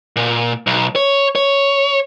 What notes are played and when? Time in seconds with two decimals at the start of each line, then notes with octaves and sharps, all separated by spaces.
0.16 A#2
0.67 B1
0.96 C#5
1.36 C#5